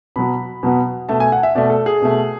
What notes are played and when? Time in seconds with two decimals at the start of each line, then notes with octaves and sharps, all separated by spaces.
0.16 B2 F#3 B3 B5
0.63 B2 F#3 B3
1.09 B2 A3 A5
1.20 G#5
1.32 F#5
1.43 E5
1.55 B2 A3 D5
1.70 A4
1.86 G#4
2.02 B2 A3